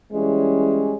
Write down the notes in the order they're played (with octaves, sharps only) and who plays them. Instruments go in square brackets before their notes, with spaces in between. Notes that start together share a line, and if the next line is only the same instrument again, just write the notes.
[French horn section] E3 G3 G#3 C#4